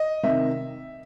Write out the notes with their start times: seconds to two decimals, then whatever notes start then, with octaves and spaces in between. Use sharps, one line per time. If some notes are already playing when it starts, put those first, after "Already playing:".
Already playing: D#5
0.23 C3 D#3 E5